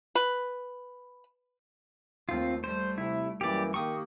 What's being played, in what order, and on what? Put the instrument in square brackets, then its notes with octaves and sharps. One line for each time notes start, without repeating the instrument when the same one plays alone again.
[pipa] B4
[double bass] D#2 A3 [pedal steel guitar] C4 F4
[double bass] G3 A3 [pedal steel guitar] C5
[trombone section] C3 [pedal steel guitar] E4
[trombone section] F#2 E3 A#3 [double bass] G3 [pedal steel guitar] G4 D5
[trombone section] D#3 G4 [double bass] A#3 [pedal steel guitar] C#6 D#6